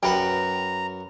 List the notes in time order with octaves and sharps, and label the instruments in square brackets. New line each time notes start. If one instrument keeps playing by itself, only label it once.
[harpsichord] F#2 B4 F#5 [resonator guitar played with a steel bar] G5 [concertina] A#5